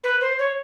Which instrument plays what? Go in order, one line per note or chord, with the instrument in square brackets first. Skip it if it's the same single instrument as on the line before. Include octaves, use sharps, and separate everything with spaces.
[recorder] B4
C5
C#5